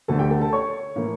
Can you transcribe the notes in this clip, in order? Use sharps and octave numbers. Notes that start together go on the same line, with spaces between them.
D2 D3 A3 A4 A5
G4 G5
A4 A5
A4 A5
C#5 C#6
A2 E3 A#3